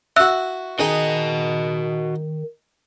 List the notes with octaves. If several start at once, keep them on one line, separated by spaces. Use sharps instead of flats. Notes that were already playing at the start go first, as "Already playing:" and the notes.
E4 F#4 E5 E6 F#6
D#3 D#4 F#4 G#4 D#5 G5